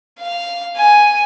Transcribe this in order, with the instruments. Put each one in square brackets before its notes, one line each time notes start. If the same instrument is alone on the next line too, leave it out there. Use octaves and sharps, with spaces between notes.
[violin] F5
G#5